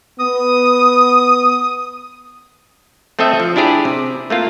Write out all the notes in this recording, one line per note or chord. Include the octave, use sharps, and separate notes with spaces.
B3 D#6
A3 C4 A4 D#5 E5
F3
D4 E4 G4 G#4 D5
C3
A3 A#3 F4